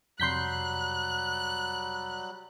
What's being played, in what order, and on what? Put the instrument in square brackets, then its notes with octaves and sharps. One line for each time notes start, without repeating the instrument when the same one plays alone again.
[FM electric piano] F2 C3 [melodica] F#3 G3 [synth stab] C6 G6 B6 [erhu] F#6